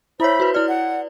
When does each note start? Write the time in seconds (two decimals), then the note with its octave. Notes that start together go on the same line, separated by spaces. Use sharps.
0.20 E4 C5 C#5 E5 B5
0.40 F#4 B4
0.54 E4 D5 F6
0.68 F#5